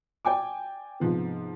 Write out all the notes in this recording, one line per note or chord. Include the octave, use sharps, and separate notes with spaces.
D5 G5 G#5 D6
G#2 C3 F3 B3